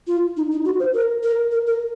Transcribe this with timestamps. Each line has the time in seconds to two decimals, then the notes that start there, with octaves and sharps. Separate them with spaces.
0.07 F4
0.37 D#4
0.51 D#4
0.65 F#4
0.80 C5
0.94 A#4
1.23 A#4
1.52 A#4
1.67 A#4